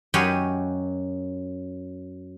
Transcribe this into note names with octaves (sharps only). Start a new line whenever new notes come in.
F#2 F#3 G4 C#5 D#5 F#5